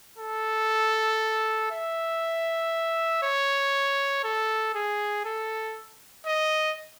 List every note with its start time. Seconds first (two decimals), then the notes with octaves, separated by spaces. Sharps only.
0.18 A4
1.71 E5
3.23 C#5
4.24 A4
4.75 G#4
5.25 A4
6.26 D#5